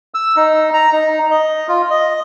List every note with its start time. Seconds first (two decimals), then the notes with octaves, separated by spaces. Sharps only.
0.14 E6
0.36 D#4
0.74 A#5
0.92 D#4
1.31 D#5
1.68 F4
1.91 D#5